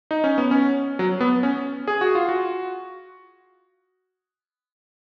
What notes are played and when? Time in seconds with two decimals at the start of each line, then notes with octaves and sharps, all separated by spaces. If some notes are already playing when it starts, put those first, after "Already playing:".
0.11 D#4
0.24 C#4
0.38 B3
0.51 C#4
0.99 F#3
1.21 B3
1.43 C#4
1.88 G#4
2.01 F#4
2.15 F4
2.29 F#4